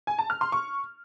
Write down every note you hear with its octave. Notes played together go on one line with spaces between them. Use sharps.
G#5
A5
F6
C6
C#6